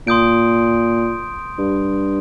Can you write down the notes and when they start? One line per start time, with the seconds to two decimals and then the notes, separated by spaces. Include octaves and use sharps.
0.07 A#2 C6 D#6 G6 D7
1.59 G2